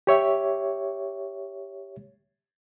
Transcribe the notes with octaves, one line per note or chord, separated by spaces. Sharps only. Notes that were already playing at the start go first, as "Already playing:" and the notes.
G4 C#5 E5